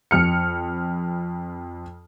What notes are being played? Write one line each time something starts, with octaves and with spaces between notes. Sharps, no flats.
F2 F6 C#7